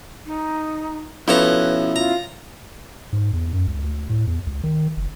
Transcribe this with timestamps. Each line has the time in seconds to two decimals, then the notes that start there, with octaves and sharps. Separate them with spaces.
0.26 D#4
1.28 B2 F3 C#4 E4 A4 B4 A#5
1.96 F4 A#5
3.13 G#2
3.33 E2
3.53 F#2
3.68 C#2
3.82 D2
4.09 A2
4.27 E2
4.47 C#2
4.64 D#3
4.97 F#1